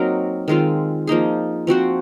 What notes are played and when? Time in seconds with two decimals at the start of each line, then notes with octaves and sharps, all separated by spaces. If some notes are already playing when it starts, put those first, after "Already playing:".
Already playing: F#3 A#3 C4 D#4 A#4
0.48 D#3 G#3 C4 F4
1.07 F3 A#3 D#4 G#4
1.67 F3 C4 F#4 C5